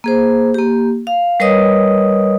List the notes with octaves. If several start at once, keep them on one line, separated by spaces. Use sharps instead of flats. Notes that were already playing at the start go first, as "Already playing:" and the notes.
A#3 G#4 C5
A#3 G4
F5
G3 A#4 B4 C#5 D#5 D#6